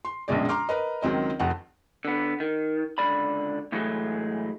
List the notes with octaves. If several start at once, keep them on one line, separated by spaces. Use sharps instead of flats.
C6
A#1 F#2 B2 G#3 D5
A#5 C6 D6 F6
A#4 B4 D#5
C#2 D#3 F#3 C4 D#5
F1 F2 F#5
D3 B3
D#3
C#2 D3 D5 B5
A2 E3 F#3 G#3 A3